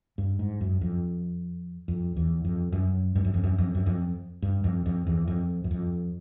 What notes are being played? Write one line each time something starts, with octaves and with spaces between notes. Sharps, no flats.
G2
G#2
F#2
F2
F2
E2
F2
F#2
G2
F#2
F2
F#2
F2
F#2
F2
G2
F2
F2
E2
F2
F#2
F2